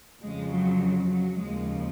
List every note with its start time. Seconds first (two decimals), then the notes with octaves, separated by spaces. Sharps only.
0.21 F2 C#3 F3 G#3
0.51 F#3
1.10 F#3
1.38 D#2 C#3 F3 G#3